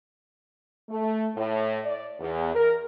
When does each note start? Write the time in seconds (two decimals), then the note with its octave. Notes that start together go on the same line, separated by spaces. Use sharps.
0.89 A3
1.36 A2
1.85 D5
2.19 E2
2.54 A#4